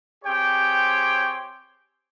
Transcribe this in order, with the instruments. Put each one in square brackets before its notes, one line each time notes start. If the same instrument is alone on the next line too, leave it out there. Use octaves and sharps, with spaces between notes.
[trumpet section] C4 G4 G#4 C#5 G5